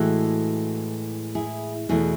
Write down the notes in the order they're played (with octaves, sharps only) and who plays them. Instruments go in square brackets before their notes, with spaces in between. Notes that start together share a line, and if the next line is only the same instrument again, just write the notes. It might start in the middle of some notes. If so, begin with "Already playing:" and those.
Already playing: [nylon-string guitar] A2 E3 G#3 F#4 A4
E4 G#4
E2 B2 A3 E4 G#4